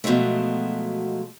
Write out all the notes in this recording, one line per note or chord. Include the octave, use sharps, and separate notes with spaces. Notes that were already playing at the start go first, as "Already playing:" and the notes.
B2 F3 F#3 G#3 A3